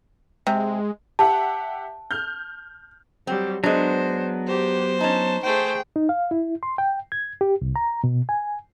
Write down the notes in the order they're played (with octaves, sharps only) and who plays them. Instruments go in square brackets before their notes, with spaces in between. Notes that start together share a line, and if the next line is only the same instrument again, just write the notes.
[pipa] C3 [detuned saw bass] G#3
[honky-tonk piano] G4 E5 F#5 [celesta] A5
[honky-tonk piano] F6 G6
[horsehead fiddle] F#3 G3 [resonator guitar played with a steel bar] C4
[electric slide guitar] F#3 B3 [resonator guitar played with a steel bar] G#3 D4 [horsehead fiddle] C5
[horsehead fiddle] G4 [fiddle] C5
[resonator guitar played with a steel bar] C#4 D#4 [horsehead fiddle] A5
[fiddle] A3 C5 [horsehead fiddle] G#4 G5
[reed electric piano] D#4
F5
E4
C6
G5
G#6
G4
C2
A#5
B2
G#5